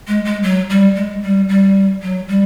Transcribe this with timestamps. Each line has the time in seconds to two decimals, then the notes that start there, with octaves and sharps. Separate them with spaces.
0.08 G#3
0.25 G#3
0.43 F#3
0.70 G3
0.96 G#3
1.23 G3
1.49 G3
2.02 F#3
2.29 G3